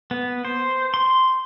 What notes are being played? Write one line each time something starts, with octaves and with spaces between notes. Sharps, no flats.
B3
C5
C6